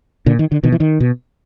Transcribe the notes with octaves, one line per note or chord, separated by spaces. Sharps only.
A#2 D3
D#3
D3
B2 D#3
E3
D#3
B2